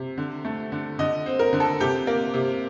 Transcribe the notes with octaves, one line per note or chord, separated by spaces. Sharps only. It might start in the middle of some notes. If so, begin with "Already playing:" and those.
Already playing: C3
D3
A3
D3
D3 D#5
C4
A#4
D3
A4
C3 G4
A#3
C3